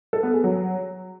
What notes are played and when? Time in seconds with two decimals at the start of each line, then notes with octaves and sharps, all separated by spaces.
0.13 A4
0.23 B3
0.34 G#4
0.44 F#3